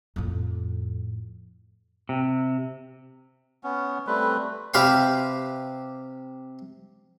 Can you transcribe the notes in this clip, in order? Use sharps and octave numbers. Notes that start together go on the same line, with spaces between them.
F2 A2
C3
B3 C#4
G3 A3 C4 B4
C3 G4 B4 F5 C6